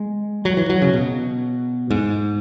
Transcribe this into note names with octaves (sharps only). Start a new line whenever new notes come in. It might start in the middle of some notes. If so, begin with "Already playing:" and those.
Already playing: G#3
F#3
E3
F#3
C#3
B2
G#2